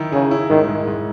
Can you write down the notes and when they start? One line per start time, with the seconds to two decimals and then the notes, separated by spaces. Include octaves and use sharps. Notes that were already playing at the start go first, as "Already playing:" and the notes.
Already playing: D#3 E4
0.12 C#3 G#4
0.31 E4
0.50 G#2 D#3
0.68 G#2
0.87 G#2